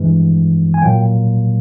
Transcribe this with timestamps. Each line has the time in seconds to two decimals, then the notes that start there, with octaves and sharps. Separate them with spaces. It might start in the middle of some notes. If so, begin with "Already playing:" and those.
Already playing: G2 E3 G#3
0.74 G#5
0.82 A#2 F#3 A#3 G5